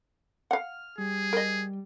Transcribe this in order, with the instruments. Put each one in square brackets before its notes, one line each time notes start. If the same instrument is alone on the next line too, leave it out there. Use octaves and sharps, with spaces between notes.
[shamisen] F5 F#5 [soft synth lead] F6
[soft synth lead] G3 [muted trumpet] G#4
[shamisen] A#4 D#5